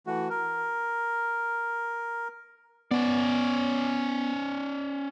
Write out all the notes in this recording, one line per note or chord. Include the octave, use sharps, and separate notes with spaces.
E3 A3 F#4
A#4
B3 C#4 D5